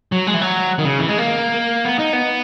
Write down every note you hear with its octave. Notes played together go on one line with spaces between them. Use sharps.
F#3
G#3
E3
F#3
D#3
C#3
E3
G#3
A#3
B3
D#4
B3